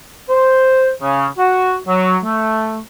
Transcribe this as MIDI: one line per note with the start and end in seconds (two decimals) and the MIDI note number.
0.29 0.90 72
1.01 1.27 49
1.38 1.76 66
1.88 2.17 54
2.24 2.78 57